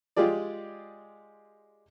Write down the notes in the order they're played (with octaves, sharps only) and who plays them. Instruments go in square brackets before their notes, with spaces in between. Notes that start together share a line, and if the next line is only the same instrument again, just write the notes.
[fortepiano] G#3 F4 G4 G#4 D5